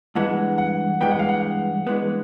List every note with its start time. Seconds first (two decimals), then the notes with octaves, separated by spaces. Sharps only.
0.15 G2 E3 G#3 B3 F#5
0.58 F#5
1.01 G2 E3 G#3 B3 G5
1.11 F#5
1.19 F5
1.29 F#5
1.87 G2 E3 G#3 B3